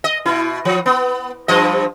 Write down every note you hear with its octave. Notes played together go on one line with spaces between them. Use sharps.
D#5
B2 E4
F3
B3
G2 F3 D#5